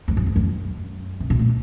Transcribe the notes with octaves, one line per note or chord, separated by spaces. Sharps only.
F2
F#2
E2
F2
F#2
C3
B2
A#2